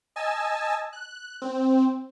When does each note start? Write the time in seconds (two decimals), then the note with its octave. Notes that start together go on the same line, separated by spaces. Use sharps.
0.16 D#5 G#5 A5 E6
0.93 F#6
1.42 C4